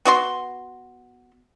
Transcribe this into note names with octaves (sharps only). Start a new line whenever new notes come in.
B3 F#4 D5 C6